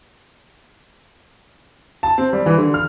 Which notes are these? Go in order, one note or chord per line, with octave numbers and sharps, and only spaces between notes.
A5
C4
G3
E3
D3
F6